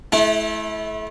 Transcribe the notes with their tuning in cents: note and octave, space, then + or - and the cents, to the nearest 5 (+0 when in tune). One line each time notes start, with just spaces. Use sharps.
A3 -35 E4 +0